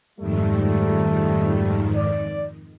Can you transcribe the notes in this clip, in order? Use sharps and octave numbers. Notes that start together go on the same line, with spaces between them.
F2 G#2 D#3 G3 A3
D5